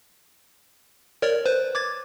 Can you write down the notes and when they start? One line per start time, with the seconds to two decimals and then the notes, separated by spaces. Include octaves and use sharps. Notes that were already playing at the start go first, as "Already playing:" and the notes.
1.22 A#4 C#5 D5
1.46 B4 C5
1.75 D6 G#6 A6